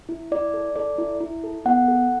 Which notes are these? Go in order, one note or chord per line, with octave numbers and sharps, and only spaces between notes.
E4
E4 D5
A4
A4 D5
E4
E4
A4
B3 F#5
A4